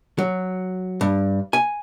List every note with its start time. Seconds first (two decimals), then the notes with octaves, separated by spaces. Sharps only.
0.18 F#3
1.01 G2
1.53 G#5